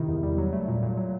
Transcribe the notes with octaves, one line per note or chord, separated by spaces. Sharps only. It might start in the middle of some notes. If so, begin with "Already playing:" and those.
Already playing: C3 D#3 E4
E2
G3
F#3
A3
A#2
A#2
F#3